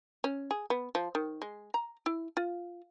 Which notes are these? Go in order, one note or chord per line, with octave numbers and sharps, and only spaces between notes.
C#4
G#4
B3
F3
D#3
G#3
A#5
E4
F4